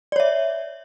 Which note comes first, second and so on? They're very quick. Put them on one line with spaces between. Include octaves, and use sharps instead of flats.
D5 C#5 E5